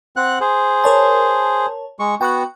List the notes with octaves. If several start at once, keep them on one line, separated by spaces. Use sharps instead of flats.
C4 F#5 F#6
G#4 C5
A#4 C#5 A5
G#3 C#6
B3 F#4 G5 C#6 F#6